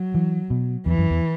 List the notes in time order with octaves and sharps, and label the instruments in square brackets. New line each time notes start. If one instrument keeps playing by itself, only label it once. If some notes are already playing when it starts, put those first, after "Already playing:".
Already playing: [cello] F#3
[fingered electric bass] E3
B2
[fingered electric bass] E2 [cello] E3
[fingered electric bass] F#2
E2